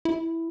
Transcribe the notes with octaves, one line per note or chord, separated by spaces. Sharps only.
E4